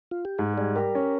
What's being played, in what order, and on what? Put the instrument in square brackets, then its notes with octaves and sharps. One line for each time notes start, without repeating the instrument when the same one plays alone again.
[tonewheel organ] F4
G4
[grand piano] G#2 [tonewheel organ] G#4
[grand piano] G3 [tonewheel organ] G#4
[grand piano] G4 [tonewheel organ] A#4
[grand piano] C#4